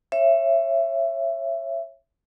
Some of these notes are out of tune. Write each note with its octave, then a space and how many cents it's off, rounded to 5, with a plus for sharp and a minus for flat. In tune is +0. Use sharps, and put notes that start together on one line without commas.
C#5 -25 E5 +20